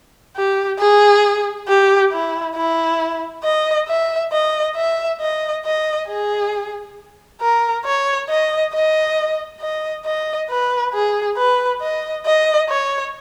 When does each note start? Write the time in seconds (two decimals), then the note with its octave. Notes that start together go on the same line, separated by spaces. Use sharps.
0.36 G4
0.79 G#4
1.68 G4
2.13 E4
2.56 E4
3.44 D#5
3.88 E5
4.32 D#5
4.76 E5
5.21 D#5
5.65 D#5
6.08 G#4
7.41 A#4
7.85 C#5
8.29 D#5
8.74 D#5
9.61 D#5
10.05 D#5
10.50 B4
10.94 G#4
11.37 B4
11.81 D#5
12.26 D#5
12.70 C#5